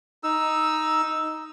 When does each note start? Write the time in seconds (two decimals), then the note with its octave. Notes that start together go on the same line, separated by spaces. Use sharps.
0.24 D#4 E6